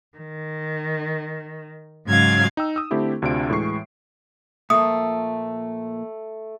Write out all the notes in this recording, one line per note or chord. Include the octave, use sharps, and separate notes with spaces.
D#3
G#2 C#3 F#3 F5 G#6
D#4 G5 E6
D#6 E6
D3 A3 C4 E4 G4 A4
D2 C3 D4 F4 D7
A2 E3 G#3 C#6 C7
A#2 F3 A3 A#3 D#6